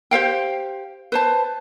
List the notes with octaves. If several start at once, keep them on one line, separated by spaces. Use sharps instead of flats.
G4 C5 F5 G5
B4 C5 A5